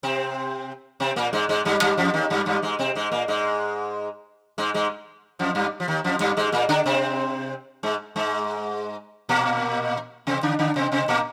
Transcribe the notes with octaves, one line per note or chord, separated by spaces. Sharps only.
C3 C4
C3 C4
A#2 A#3
G#2 G#3
G#2 G#3
G2 G3
G2 G3
F2 F3
D#2 D#3
G2 G3
G2 G3
G#2 G#3
C3 C4
G#2 G#3
A#2 A#3
G#2 G#3
G#2 G#3
G#2 G#3
F2 F3
G2 G3
F3
D#2 D#3
F2 F3
G2 G3
G#2 G#3
A#2 A#3
D3 D4
C3 C4
G#2 G#3
G#2 G#3
A#2 A#3
C3 C4
D3 D4
D3 D4
C3 C4
C3 C4
A#2 A#3